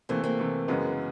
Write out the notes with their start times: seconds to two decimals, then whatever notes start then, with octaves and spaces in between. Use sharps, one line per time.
0.09 C3 E3 A3 A#3 C4
0.24 A#3 C4
0.39 C3 E3 A3
0.68 F#2 C#3 E3 G#3 B3